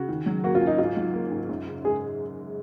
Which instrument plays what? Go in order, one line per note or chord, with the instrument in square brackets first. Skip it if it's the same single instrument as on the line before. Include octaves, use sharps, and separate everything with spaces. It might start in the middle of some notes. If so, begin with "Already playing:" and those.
Already playing: [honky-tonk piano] C#3 [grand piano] F#4
[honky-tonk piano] D#3
F#3
[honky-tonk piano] A#3 [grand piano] F#4
[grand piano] F4
[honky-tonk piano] C#4
[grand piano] D#4
[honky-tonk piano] G#2 [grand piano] F4
[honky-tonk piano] F#3
A#3
G#2
F#2
C#3
[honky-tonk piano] G#3 [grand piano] G#4